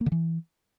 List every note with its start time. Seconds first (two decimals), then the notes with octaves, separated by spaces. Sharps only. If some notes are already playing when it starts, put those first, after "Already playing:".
0.01 A#3
0.06 D3
0.12 E3